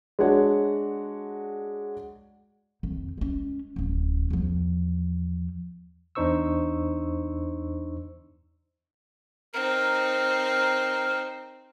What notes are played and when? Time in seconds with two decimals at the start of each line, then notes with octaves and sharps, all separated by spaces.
0.19 G#3 D4 F#4 C#5 F#5
2.83 F2 D#3
3.18 G#3 C#4
3.76 D1 C#4
4.30 E2 F3
6.15 E2 D4 D#4 C5 C#6 E6
9.54 C4 D#4 A#4